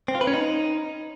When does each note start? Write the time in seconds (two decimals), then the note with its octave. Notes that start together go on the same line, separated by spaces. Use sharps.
0.08 C4
0.15 F4
0.21 B4
0.27 C#4
0.34 D#4